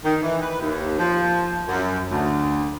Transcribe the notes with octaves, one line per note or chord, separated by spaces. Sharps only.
D#3
E3
B4
D#2
F3
F#2
D2